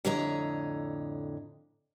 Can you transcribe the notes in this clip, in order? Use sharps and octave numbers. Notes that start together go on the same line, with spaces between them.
F2 A2 D3 C#5 D#5 A#5